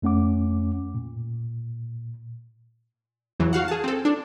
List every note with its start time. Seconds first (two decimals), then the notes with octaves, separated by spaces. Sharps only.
0.02 F2 A3 C#4 F#5 D6
0.95 A#2
3.40 E2 C#3 E3 F#3
3.53 F#4 F5 F#5
3.68 G#4 A5
3.84 C4 A4
4.05 D4